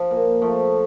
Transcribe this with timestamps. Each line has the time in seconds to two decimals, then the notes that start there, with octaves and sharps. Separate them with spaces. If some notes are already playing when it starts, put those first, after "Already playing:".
Already playing: F3
0.11 A#2
0.42 F3 A3